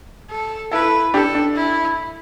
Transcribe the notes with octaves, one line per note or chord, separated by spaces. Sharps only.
A4
E4 A4 B4
D4 G4 A4
D4
E4